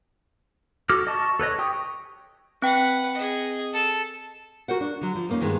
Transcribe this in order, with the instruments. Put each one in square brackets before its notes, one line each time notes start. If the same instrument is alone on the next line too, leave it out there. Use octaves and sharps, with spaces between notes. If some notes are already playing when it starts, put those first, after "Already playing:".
[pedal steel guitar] F#4 A4 D6 F6
D#5 A5 C#6
A4 B4 C#5 D#5
G4 G5 C#6 D#6
[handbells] C4 G5 [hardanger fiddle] B4 F#5
[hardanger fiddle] G#4 D#5
A4
[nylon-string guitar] F#4 A#4 C5 F#5
D4
D3 F#3
F3
F2 G#3 A#3 C4 C#4 D#4
G2 D#3 G#3 A#3 B3